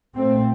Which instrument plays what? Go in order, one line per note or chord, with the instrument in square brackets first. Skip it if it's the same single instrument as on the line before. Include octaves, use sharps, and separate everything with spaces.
[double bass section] A#2 A3 C4